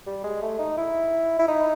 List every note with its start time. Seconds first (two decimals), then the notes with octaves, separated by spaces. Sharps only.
0.07 G3
0.24 G#3
0.42 A3
0.59 D#4
0.78 E4
1.39 E4
1.48 D#4